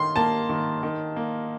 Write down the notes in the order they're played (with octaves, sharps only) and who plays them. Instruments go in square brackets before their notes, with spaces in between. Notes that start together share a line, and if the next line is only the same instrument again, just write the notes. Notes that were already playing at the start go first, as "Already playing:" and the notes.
Already playing: [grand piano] D#3 D#4 [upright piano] C6
[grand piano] A#3 [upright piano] A5
[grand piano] D#3
D#3
A#3